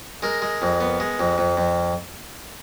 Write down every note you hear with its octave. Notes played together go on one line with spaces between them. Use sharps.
G#3 A#4
G#3
F2
B3
G#3
F2
F2
F2